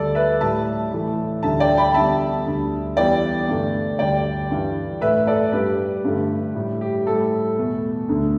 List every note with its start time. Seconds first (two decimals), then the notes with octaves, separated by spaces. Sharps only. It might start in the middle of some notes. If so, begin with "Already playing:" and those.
Already playing: D2 D3 G3 A4 D5
0.15 B4 E5
0.41 A2 G3 E5 A5
0.92 A2 E3 A3
1.43 D2 D3 G3 E5 A5
1.60 D5 G5
1.77 G5 B5
1.94 E2 D3 G3 E5 A5
2.46 D2 D3 G3
2.97 E2 E3 G3 D5 G5
3.48 G2 D3 A3
3.99 D2 D3 G3 D5 G5
4.51 G2 E3 G3
5.01 A2 A3 B4 E5
5.27 A4 D5
5.52 G2 G3 G4 B4
6.04 G2 D3 A3
6.55 A2 G3
6.81 G4
7.06 A2 G3 A4
7.58 E2 B2 A3
8.09 D2 D3 A3